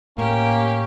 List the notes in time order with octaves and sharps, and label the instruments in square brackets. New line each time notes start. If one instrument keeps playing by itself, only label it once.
[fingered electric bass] A2 [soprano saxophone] A#3 [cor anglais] C#4 [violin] G4